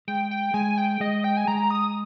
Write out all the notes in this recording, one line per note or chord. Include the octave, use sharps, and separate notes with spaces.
G#3 G5
G5
G#3 G#5
G5
G#3 D#5
G5
G#5
G#3 A#5
D#6